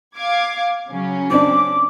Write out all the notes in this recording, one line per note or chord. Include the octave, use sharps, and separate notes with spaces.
F5 D6 G#6
C#3 F#3 C#4
C4 D4 D6